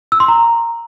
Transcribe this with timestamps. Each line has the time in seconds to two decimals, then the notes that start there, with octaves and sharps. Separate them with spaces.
0.12 E6
0.20 C6
0.28 A#5